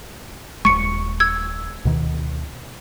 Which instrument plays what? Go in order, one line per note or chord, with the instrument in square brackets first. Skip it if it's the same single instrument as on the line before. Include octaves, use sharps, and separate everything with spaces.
[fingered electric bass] D#1 B1 G#3 [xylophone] C#6 C#7
[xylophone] E6 G#6
[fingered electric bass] D2 B2 D#3